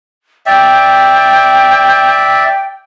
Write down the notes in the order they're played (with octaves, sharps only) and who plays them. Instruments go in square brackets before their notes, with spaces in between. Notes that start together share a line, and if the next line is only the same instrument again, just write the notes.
[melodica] D5 E5 [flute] G5